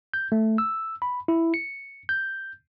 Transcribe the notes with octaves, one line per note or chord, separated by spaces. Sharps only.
G6
A3
E6
B5
E4
C#7
G6